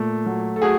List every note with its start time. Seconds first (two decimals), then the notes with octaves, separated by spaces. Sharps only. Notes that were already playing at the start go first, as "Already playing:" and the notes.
Already playing: A#2 A3
0.26 F#3
0.56 A4
0.62 A3 F#4 G#4